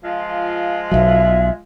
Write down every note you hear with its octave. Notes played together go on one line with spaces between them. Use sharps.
F3 G#3 F4
B1 F#3 E5